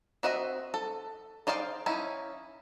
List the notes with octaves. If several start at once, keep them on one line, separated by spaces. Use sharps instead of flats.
C4 F#4 D#5 E5
A4
D#4 C5 D5 F5 G5
C#4 D#4 E4